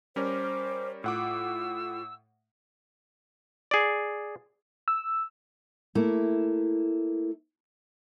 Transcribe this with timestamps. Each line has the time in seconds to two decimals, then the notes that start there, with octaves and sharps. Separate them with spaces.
0.16 G3 C#4 A#4 C5 D6
1.04 A2 F4 F#5 D6 E6
3.71 G#4 D5
4.88 E6
5.95 A3 A#3 E4